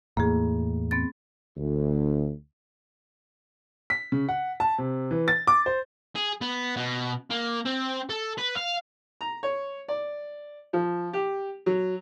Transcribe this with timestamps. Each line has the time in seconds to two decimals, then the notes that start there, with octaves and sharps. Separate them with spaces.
0.17 E2 A2 A#3 G#4
0.91 B3 C4 A6
1.57 D2
3.90 B6
4.12 C#3
4.29 F#5
4.60 A5
4.78 C3
5.11 E3
5.28 A6
5.47 D6
5.66 C5
6.15 G#4
6.41 B3
6.76 B2
7.30 A#3
7.66 C4
8.09 A4
8.38 B4
8.57 F5
9.21 A#5
9.43 C#5
9.88 D5
10.73 F3
11.13 G4
11.66 F#3